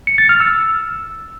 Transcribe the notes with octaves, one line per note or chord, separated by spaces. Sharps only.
C#7
A6
F6
E6